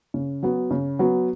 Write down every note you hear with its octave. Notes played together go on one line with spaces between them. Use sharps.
C#3
F#3 B3
C#3
F#3 B3